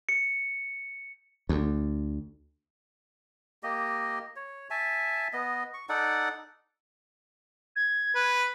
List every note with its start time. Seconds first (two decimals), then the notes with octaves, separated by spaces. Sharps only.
0.09 C#7
1.49 D2
3.63 A#3 G4 D#5
4.36 C#5
4.70 E5 G#5 A5
5.33 B3 D#5
5.74 C#6
5.89 D#4 A4 D5 F#5
7.76 G#6
8.15 B4